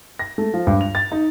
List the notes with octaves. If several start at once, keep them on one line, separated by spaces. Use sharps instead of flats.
A#6
A3
F3
G2
F7
A6
D#4